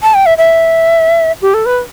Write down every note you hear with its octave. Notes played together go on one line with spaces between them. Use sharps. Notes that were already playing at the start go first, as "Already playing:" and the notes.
A5
G5
E5
E5
G4
A4
B4